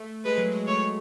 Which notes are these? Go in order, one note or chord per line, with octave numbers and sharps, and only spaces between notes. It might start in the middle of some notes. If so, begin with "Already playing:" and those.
Already playing: A3
G#3 B4
F#3
G#3
A3 C#5